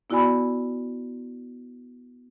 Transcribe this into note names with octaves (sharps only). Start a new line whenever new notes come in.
B3 E4 F#4 D5 G#5 B5